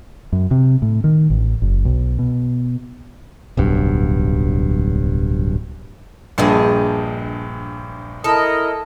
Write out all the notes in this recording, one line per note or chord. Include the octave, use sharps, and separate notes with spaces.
F#2
C3
A2
D#3
A1
F#1
B1
B2
D1 B1 G2
A#1 G2 G#4 D#5 A5
E4 A4 A#4 D#5